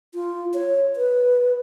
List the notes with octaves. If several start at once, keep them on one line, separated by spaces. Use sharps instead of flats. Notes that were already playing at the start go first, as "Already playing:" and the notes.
F4
C#5
B4